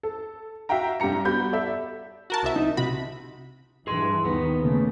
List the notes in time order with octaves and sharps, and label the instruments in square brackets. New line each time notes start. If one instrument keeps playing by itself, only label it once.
[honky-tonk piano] A4
F#4 E5 F5 G5 A#5
G2 C3 G4 A#5 C#7
G3 B3 F#4 B5 G6
A4 D5 E5
[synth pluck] F#4 A#4 A5
C2 E5
[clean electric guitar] D#4
[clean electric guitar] C3 F#4 [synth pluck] B5
[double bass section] G2 E3 [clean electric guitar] G#4 C6
[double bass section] D#2 D#3 [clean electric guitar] B3
[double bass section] C#3 A3 A#3